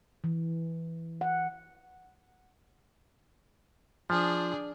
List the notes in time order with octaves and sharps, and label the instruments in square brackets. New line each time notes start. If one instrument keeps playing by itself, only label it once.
[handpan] E3
F#5
[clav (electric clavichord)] F3 [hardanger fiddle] D4 G#4